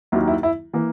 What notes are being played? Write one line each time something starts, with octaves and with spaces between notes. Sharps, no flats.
D#2 D#3 F#3 A#3 E4
E4
E4
E3 A#3